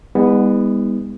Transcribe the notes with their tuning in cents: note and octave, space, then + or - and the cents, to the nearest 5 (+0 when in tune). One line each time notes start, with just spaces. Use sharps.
G#3 -40 B3 +0 D#4 +40